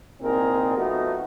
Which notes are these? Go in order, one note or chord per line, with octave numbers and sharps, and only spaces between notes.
C2 A#2 C4 D#4 G#4 A#4
F3 A3 B3 D#4 F#4